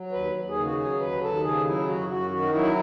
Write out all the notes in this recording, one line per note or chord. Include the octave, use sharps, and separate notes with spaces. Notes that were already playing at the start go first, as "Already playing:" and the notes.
Already playing: F#3
D#2 B4
D#2
G#4
C#3
F#4
F#3 G#4
D#2 B4
D#2 A4
C#3 G#4
F#3 E4
F#2 F#4
F#2 F#4
D#3 F#4
F#3 E4